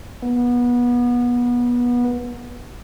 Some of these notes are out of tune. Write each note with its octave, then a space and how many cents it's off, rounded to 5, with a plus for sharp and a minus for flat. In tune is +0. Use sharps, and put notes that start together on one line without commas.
B3 -25